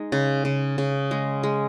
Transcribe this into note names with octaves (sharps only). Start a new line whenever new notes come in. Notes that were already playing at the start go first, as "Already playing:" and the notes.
Already playing: G#3 D#4
C#3
C#3
C#3
G#3
G#3